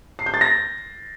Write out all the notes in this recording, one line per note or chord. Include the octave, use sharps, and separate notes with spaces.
C7
G6
A6
A#6